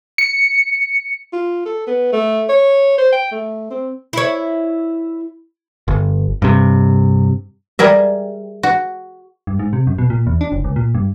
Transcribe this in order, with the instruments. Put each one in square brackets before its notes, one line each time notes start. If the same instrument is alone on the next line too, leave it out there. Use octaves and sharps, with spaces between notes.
[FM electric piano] C#7
[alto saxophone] F4
A4
B3
A3
C#5
C5
G5
A3
C4
[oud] E4 C#5
[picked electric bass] G1
G2 C3
[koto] G3 G#4 A#4 E5
F#4
[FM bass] G2
G#2
C3
F#2
B2
A#2
E2
D4
F#1
C#2
A#2
G2